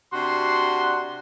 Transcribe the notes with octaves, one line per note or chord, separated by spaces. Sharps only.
C3 D4 F#4 C6